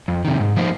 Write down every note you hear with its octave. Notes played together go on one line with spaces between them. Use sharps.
F2
C3 D#3
G#2
F3 A#3 D#4 C5